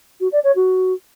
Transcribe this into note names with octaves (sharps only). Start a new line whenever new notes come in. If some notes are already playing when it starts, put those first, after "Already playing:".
F#4
D5
C#5
F#4